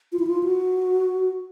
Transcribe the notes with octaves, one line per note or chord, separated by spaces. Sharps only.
F4
E4
F4
F#4